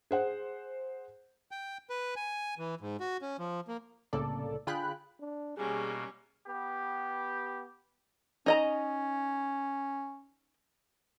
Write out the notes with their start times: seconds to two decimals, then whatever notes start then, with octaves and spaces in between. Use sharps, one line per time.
0.11 G#4 C5 F#5
1.51 G5
1.90 B4
2.16 G#5
2.58 E3
2.81 G#2
3.00 F#4
3.22 C#4
3.39 F3
3.68 A#3
4.13 C2 A2 C#3 A#3 A4 D5
4.67 D3 F4 G#4 G5 B5 F#6
5.20 D4
5.57 B2 G3 A#3 C#4 G#4
6.47 B3 G4
8.46 C#4 D#4 D#5 A#5